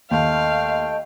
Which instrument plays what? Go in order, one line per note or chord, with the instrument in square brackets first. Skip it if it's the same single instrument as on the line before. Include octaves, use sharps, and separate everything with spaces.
[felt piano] D#2 [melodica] A3 G5 [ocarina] D#5 [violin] F5